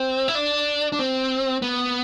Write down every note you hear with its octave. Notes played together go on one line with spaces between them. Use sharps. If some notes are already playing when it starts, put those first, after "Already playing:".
Already playing: C4
E4
D4
D4
C4
B3